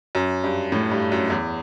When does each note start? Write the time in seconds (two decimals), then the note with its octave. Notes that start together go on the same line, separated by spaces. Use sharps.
0.15 F#2
0.44 G2
0.72 A2
0.91 G2
1.12 F#2
1.30 E2